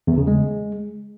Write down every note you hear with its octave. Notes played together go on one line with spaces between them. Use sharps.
E2
C#3
G#3